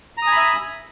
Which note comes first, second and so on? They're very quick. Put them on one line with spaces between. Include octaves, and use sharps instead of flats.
A#5 D#6 G#5 B5 E5